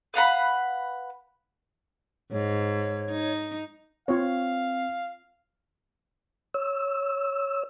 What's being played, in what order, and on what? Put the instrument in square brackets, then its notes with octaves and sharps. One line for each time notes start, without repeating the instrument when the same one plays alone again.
[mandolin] B4 F5 F#5 B5
[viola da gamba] G#2 [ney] C#5
[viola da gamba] D#4
[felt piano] C4 [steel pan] F4 C#5 [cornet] F5
[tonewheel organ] C#5 E6